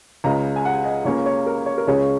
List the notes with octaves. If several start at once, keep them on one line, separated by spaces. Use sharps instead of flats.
C#2 C#3 G#3 A#5
G#5
F#5
D#5
C#2 C#3 A#3 C#4 C#5
C#5
A#4
C#5
A#4
C#2 C#3 G#3 C#4 C#5